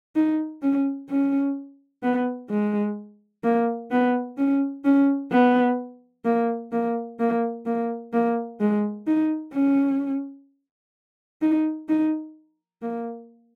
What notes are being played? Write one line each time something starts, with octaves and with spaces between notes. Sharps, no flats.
D#4
C#4
C#4
B3
G#3
A#3
B3
C#4
C#4
B3
A#3
A#3
A#3
A#3
A#3
G#3
D#4
C#4
D#4
D#4
A#3